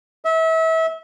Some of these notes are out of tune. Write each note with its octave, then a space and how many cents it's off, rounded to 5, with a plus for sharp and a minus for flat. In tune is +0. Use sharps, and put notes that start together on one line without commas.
E5 -30